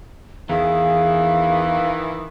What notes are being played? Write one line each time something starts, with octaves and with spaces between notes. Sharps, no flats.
E2 D#3 E3 G#4 F5